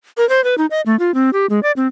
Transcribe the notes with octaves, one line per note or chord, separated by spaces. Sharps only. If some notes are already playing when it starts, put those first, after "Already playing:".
A#4
C5
B4
D#4
D#5
A3
F4
C4
G4
G#3
D5
C4